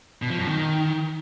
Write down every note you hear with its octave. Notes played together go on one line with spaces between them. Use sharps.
B2
F3
F#2
D#3